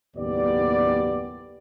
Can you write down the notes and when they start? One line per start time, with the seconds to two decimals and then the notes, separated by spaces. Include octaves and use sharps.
0.16 F#1 D#2 A2 B3 G4 D5